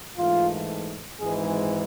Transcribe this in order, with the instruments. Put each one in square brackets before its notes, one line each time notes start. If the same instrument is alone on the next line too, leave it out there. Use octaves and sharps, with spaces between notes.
[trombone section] G#2 E3 A3 F4
G#1 G#2 E3 G#3 G#4